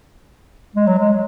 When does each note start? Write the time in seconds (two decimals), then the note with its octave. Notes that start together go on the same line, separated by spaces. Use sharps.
0.76 G#3
0.87 F#3
0.99 G#3